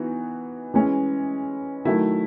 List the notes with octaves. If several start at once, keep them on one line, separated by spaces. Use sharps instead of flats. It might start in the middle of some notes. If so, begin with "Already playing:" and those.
Already playing: E3 B3 D#4 F#4
E3 G#3 C#4 E4
D#3 F#3 A3 E4